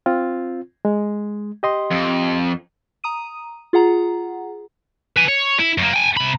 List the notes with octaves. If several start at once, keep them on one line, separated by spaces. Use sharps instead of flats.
C4 F4
G#3
G4 D#5 C6
F2
A#5 D#6 D#7
F4 G#4 F#5 A#5
B4 G#5
C#5
E4
F#2 A#3
G5 G#5
C3 B5